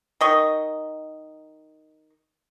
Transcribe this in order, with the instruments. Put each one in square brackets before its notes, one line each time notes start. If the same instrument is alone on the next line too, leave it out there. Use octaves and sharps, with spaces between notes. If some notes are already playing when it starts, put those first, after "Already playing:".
[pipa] D#3 D#5 C#6